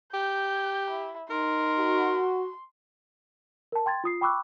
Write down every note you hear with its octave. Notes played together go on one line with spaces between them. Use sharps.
G4 G6
E4
D#4 A#4 C6
F#4
A#4 A5
G5 C6 G#6 A6
F4 D#6 C7
G5 B5 C#6 D6 E6 F#6